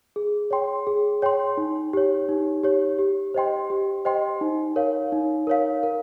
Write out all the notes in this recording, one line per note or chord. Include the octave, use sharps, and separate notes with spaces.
G#4
C#5 G5 C6
G#4
C#5 G5 C6
D#4
G4 C#5
D#4
G4 C#5
G4
C5 D#5 G5 C6
G4
C5 D#5 G5 C6
D#4
A#4 C#5 F5
D#4
A#4 C#5 F5
A#4